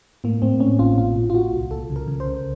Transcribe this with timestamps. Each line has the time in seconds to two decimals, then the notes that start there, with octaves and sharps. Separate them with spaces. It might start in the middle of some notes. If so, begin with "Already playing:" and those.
0.24 A2 A#3
0.42 A2 C4
0.60 A2 C#4
0.79 A1 F4
0.98 A#2 F4
1.15 A#2
1.30 F4
1.34 A#2 F#4
1.53 C2
1.71 C#2 A4
1.90 C#3
1.96 A#4
2.08 C#3
2.20 C5
2.26 C#2